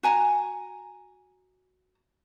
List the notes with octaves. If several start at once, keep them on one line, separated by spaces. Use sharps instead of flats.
F#4 G#5 A#5